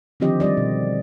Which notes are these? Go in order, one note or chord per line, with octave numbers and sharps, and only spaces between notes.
D3 D#3 F3 C4 G4 D#5
G3 G4 D5 D#5
B2